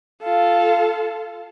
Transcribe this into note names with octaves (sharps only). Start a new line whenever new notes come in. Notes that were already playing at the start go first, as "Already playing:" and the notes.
F4 A4